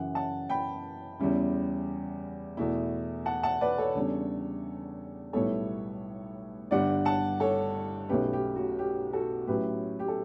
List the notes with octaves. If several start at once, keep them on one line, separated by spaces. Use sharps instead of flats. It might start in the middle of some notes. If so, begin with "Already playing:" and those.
Already playing: F#2 C#3 E3 F#5
F#5 A5
G5 B5
E2 C#3 G3 C#4 E4
E2 B2 A3 E4
F#5 A5
F#5 A5
B4 D5
A4 C#5
E2 C#3 G3 D4
B1 A2 G3 B3 E4 A4 C#5
G1 G2 D3 G3 D5 F#5
F#5 A5
A4 C#5
B1 B2 A3 C#4 G4 B4
G4
F#4
G4
F#4 A4
A2 F#3 C#4 E4 G4 B4
G4
A4